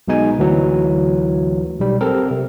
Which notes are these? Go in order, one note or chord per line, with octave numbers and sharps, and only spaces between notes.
B1 B2 G#3 D#4 G#5
D2 E3 F#3
B1 G3
C4 A4 A#4
C3